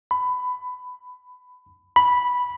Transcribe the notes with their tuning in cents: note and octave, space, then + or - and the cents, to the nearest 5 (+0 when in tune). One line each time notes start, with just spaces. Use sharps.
B5 +20
B5 -5